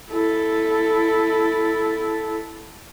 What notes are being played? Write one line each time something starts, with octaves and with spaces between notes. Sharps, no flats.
E4 A4